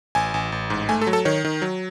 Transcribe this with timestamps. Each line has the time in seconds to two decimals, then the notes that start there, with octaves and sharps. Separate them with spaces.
0.15 A1 G#5
0.34 A1
0.52 A1
0.70 G#2
0.89 A3 G#5
1.02 A4
1.07 F#3
1.13 A4
1.25 D#3 C#5
1.44 D#3
1.62 F#3